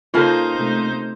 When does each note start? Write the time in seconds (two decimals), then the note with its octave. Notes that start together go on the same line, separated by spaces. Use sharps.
0.14 C#3 A#3 D#4 F4 A4 C5 A5
0.56 C3 A3